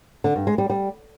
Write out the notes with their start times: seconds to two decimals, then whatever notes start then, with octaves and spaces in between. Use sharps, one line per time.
0.24 D3
0.36 G2
0.47 G#3
0.58 G3
0.70 G3